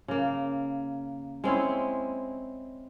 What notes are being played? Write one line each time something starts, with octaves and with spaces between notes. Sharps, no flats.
C#3 A#3
G#3 C4 C#4 E4